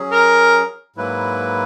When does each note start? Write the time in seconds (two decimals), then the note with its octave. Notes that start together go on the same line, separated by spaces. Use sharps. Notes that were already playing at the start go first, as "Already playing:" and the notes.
Already playing: F#3 C#4 G#4
0.11 A#4
0.96 G#2 F#3 A#3 E4 B4